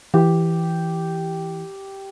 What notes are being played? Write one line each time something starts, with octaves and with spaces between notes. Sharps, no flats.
E3 G4